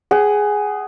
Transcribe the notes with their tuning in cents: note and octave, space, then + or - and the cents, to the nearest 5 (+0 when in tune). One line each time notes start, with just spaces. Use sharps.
G#4 +0 F#5 +30